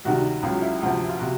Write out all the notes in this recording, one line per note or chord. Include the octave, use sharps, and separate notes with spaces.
D2 C3 D#3 G3 F#4
C#2 C#3 F#3 F4
E4
D2 C3 F3
F4
C3 F#4